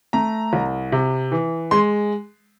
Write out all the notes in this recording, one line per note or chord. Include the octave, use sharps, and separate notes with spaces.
A3 A#5
C2
C3
E3
G#3 C6